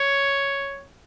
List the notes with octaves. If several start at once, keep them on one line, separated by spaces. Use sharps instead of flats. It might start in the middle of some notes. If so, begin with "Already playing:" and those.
Already playing: C#5